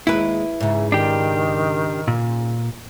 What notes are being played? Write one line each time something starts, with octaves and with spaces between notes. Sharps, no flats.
D#2 G#3 E4 B4
G#2 C#3 E5
D#3 D4 G4
A#2